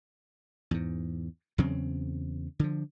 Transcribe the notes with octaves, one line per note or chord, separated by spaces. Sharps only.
E2 G#2
E2 C#3 F#3 C4
D3 F3